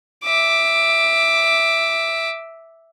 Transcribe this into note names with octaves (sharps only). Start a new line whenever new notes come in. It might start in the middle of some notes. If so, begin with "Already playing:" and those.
E5 D6